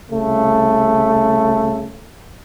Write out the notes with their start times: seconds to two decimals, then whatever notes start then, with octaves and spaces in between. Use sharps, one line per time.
0.10 C2 C#3 A3